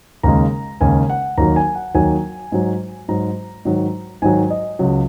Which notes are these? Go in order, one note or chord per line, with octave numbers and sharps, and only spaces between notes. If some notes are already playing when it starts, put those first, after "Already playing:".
D#2 C#3 G#3 A#5
D#2 C#3 G#3 G#5
F#5
D#2 D#3 F#3 A#5
G#5
F#5
D#2 D#3 F#3 G#5
G#2 F#3
G#2 F#3 A#5
G#2 D#3 F#3
G#2 D#3 F#3 G#5
D#5
C#2 C#3 F#3